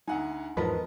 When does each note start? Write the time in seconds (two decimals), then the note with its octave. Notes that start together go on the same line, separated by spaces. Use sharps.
0.08 D2 D#4 F#5 G#5
0.57 E2 G#2 F3 B3 A#4 B4 D#5 A5